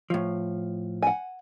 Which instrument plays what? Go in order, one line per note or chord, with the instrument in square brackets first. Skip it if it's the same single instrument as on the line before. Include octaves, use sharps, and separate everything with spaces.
[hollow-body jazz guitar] A2 F3
[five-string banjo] F#5 G#5